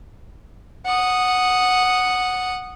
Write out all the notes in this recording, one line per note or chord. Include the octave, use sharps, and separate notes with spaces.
F#5 D#6